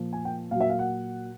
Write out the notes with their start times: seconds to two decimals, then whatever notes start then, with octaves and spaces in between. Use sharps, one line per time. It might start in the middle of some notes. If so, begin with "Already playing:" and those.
Already playing: A#2 F3
0.13 G#5
0.25 G5
0.51 A#2 F#3 F5
0.61 E5
0.70 F5
0.79 F#5